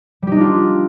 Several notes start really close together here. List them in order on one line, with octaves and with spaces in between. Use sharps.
G3 G4 D#4 D4 F4